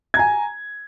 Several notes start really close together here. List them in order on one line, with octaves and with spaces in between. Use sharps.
G#6 A#5 G#5